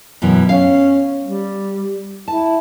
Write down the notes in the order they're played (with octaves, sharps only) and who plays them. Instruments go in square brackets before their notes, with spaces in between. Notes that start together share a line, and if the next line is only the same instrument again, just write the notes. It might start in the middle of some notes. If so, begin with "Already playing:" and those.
[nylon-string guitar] F#2 B2 E3
[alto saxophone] C#4 [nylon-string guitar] F5
[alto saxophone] G3
[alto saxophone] E4 [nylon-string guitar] A5